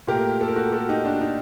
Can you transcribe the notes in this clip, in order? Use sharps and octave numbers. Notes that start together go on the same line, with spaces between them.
A#2 A3 G4 A#4
A4
A#4
F#4 A4
F#4 A4
D#4 G4
D4 F#4
D#4